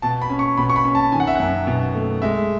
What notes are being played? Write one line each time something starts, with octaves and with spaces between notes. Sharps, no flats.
B2 A5
B5
C#4
C#6
B2 B5
C#6
B5
C#4
A5
D#3 G#5
F#5
E5
F#2 F#5
B2
A3
G#3 E5